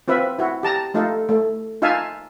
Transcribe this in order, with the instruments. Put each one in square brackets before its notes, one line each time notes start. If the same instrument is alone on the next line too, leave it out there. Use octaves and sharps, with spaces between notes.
[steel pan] C4 F4 B4 E5
E4 F#4
G4 A5 A#5
A3 D#4 F4 A4
A3
D#4 F4 E5 F5 G#5 A5